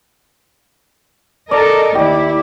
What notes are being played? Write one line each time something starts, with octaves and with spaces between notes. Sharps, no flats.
A4 A#4 D5 D#5
D#2 E4 G4 D5